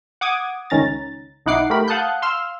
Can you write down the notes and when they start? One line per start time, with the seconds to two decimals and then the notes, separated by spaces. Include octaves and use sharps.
0.21 F#5 D6 D#6 G#6
0.70 C#2 D#3 C#4 A#5 A6
1.46 B1 D#4 E4 F#5 D6 C7
1.70 A3 G4 A#4 B5
1.88 F5 F#5 A5 D#6 F#6 G6
2.22 F5 C6 E6 F6